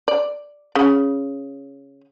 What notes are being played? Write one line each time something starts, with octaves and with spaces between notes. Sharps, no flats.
D5
C#3